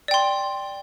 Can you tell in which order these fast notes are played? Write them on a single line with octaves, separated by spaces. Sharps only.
D5 G5 C6